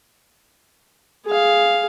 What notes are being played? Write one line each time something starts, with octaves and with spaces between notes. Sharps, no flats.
G#4 F5